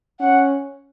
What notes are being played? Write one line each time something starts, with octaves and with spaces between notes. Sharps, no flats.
C#4 F#5